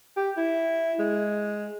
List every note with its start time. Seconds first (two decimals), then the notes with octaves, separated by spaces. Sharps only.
0.17 G4
0.37 E4
0.99 G#3